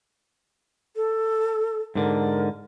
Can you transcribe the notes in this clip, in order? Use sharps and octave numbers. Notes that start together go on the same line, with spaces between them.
A4
G#2 D3 A#4